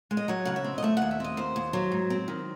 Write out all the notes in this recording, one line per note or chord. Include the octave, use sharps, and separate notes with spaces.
G#3
D#5
F#3 C#5
C#3 F#5
E5
C4
D#5
A3 E5
D#2 F#5
E5
C4 D#5
D#2 C5
D#2
F#3
G#2
C4
D#3